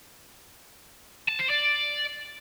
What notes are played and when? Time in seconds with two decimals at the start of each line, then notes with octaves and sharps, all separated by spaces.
1.28 A5
1.39 C5
1.50 D5